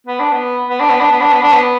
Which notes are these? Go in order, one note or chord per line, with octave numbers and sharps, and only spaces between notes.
B3
D4
B3
B3
D4
B3
D4
B3
D4
B3
D4
B3